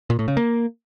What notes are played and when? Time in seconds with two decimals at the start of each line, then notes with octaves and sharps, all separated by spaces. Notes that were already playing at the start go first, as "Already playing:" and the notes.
0.10 A#2
0.19 A2
0.28 C#3
0.37 A#3